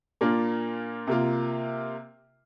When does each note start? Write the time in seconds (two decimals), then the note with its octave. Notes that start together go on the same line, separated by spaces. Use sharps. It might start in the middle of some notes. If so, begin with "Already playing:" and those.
0.21 A#2 A#3 D4 F4
1.07 C3 A#3 F4